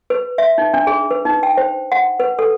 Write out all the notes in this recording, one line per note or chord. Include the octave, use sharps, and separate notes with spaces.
B4
E5
D#4
D4
G#4
B4
D#4
G5
C5
F#5
B4
A4